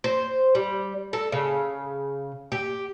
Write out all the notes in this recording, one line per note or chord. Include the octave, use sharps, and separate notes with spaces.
C5
G3
A4
C#3
G4